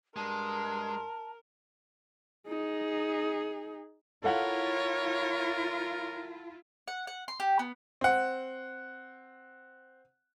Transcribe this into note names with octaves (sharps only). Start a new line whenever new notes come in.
G2 G#3 A#4 A5 C6
D#4 G#4
E4 F4 A4 A#4 C#5 F5 F#5
F#5
F#5
C6
G4
B3
C4 F#5